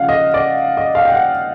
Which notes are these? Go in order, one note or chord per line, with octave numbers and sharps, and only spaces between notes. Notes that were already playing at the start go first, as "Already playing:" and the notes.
Already playing: C#3 F3 F5 F#5
D#5
D5
D#5
F5
G5
F#5